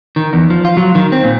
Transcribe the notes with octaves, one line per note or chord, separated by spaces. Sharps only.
D#3
E2
F3
F4
F#3
D#3
C4
A#2